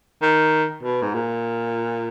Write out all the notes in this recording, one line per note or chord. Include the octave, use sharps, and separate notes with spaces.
D#3
B2
G#2
A#2